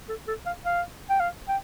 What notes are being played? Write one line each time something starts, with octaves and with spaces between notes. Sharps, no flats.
A4
A4
F5
F5
G5
F5
G5